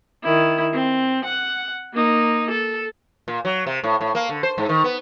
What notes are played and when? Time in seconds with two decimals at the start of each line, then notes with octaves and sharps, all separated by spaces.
0.24 D#3 E4
0.73 C4
1.25 F#5
1.94 A#3 D#4
2.51 A4
3.28 A#2
3.45 F#3
3.67 C3
3.84 A2
4.01 A2
4.15 A#3
4.29 D3
4.43 C5
4.58 G#2
4.69 D#3
4.84 B3